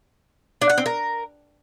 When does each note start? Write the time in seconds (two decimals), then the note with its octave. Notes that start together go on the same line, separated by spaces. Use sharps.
0.61 D4
0.70 F#5
0.78 C4
0.86 A#4